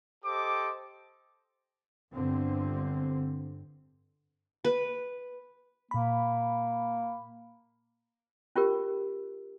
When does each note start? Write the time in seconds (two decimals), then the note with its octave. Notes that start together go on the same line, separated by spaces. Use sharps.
0.25 G4 A4 C5 D#5 D6
2.13 G1 D3 C4
4.65 B4
5.91 A#2 A#3 B5
8.56 C#4 F4 G4 A#4